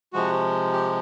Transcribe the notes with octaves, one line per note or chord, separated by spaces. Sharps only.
C3 F3 G#3 F#4
G4